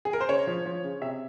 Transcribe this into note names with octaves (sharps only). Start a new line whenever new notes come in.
G#4
A#4
C5
C#3 C#5
F3
F3
C#3
C3 E5